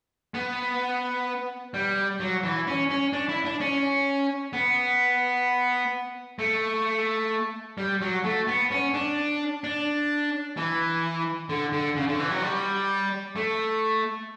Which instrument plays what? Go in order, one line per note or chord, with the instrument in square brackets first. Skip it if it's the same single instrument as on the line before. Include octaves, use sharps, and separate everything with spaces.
[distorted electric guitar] B3
G3
F#3
E3
C#4
C#4
D4
E4
D4
C#4
B3
A3
G3
F#3
A3
B3
C#4
D4
D4
E3
D3
D3
C#3
D3
E3
F#3
G3
A3